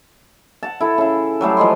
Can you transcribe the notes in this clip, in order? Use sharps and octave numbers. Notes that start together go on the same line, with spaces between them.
F#5 A5
E4 A4
C#3 E4
F#3 G3 A3 G#4
F3 G#3 D#5 C6